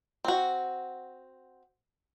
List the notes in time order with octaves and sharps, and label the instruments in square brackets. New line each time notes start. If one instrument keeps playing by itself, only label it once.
[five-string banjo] C4 F#4